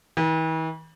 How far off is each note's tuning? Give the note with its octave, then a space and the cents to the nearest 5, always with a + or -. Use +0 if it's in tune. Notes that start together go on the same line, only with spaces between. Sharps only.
E3 -45